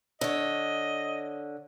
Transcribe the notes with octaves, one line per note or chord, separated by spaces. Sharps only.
D3 C#5 D#5